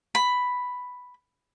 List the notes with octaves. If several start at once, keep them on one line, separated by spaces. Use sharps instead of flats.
B5